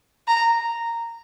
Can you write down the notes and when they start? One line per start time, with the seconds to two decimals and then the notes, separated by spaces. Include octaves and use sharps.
0.28 A#5